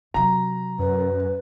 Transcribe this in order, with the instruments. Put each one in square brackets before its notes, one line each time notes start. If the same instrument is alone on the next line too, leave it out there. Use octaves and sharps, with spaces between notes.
[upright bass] C3 F#3 [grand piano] A#5
[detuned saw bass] F#2 [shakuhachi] B4